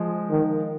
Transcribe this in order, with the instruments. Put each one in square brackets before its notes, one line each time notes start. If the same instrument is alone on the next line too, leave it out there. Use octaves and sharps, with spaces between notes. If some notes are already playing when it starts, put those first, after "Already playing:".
Already playing: [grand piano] F3 G#3
[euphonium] D#3